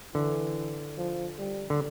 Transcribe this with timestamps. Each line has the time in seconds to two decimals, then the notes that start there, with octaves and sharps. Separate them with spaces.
0.14 D3 E3
0.98 F3
1.38 G3
1.70 D3